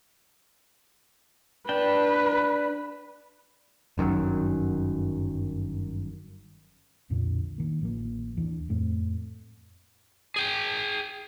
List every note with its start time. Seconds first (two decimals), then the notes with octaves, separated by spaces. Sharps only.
1.69 D4 B4 G5
3.98 G1 F#2 D#3 F#3
7.10 B1 F2 A#2 D3
7.58 D#3 A#3
7.81 A1 F3 A#3
8.37 D#2 E3 D4
8.69 F2 A2 A3 C4
10.36 G#4 G5